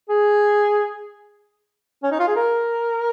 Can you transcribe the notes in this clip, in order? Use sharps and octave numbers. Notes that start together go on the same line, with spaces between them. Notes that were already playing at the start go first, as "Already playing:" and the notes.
G#4
C#4
D#4
F4
G#4
A#4